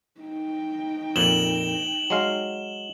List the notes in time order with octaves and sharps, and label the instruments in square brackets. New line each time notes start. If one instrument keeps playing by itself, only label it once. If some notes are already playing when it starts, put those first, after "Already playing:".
[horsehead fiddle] D#4 G5
[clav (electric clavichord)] F2 A#2 [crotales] E7 F#7 G7
[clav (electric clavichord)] F#3 G#3 F5